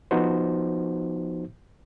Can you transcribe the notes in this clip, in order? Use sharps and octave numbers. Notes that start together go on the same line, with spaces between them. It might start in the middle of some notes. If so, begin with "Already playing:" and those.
F3 B3 D#4 F#4 C5